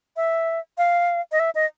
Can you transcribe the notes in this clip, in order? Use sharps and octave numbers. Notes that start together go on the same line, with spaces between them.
E5
F5
D#5
E5
D#5